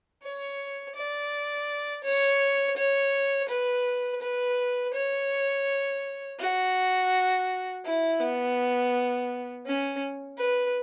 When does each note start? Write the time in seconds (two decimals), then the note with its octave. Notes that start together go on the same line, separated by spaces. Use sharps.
0.23 C#5
0.96 D5
2.04 C#5
2.77 C#5
3.49 B4
4.22 B4
4.94 C#5
6.39 F#4
7.85 E4
8.20 B3
9.66 C#4
10.38 B4